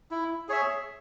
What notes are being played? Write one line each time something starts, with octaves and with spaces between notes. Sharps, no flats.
E4
G#4 C#5 E5